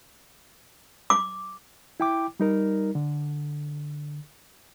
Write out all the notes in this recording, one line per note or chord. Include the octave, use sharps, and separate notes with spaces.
D6
E4 G5 D6
G3 D#4 A#4
D3